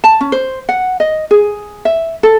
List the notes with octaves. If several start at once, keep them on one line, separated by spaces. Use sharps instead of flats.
A5
C#4
C5
F#5
D#5
G#4
E5
A4